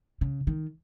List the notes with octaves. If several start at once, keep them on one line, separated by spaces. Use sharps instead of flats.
C#3
D#3